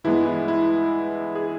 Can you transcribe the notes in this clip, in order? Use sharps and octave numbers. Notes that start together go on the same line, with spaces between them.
G2 E3 G#3 B3 E4
E4
E4
G#4